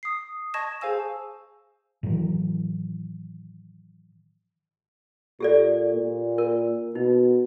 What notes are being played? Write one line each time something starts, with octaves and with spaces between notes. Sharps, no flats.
D#6 C7
D#5 A5 C#6 G#6 A#6 E7
G#4 C5 F5 G#5 E6 E7
A2 D#3 E3 F#3
A#2 G4 A4 D5
A#2
A#4
B2 D#4